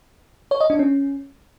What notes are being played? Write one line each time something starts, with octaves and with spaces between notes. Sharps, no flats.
C#5
D#5
D4
C#4